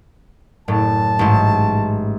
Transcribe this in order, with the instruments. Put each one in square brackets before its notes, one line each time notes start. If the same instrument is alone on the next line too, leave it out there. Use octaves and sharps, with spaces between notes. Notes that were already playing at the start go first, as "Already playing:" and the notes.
[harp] F#1 A2 [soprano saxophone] A5
[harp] A1 G#2